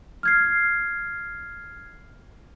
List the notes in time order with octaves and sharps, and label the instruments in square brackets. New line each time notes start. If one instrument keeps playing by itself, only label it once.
[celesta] F6 G#6 C7